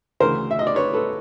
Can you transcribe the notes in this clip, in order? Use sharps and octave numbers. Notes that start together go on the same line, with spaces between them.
D2 C#3 E3 A#4 C5
E5
D#5
D5
B4 C#5
A4 B4